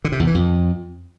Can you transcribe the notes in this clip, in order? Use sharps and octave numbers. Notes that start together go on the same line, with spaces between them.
D3
C3
E2
E3
F2